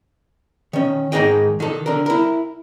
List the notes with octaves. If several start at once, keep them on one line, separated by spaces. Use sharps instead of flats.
D#3 C#4
G#2 D#3 D#4 G#4 D#5 G5
D#3 A4
D3 A#4
E4 A#4